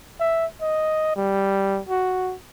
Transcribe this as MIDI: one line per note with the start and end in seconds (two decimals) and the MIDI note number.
0.20 0.46 76
0.61 1.12 75
1.16 1.80 55
1.89 2.35 66